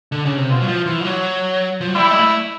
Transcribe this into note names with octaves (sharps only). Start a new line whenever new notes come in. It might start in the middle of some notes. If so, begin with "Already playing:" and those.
D3
C#3
C3
B2 F4
F#3
F3
E3
F3
F#3
F3
F#3
G3 E4
G#3
A3